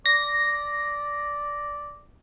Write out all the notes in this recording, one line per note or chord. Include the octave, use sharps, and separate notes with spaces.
D5 A#6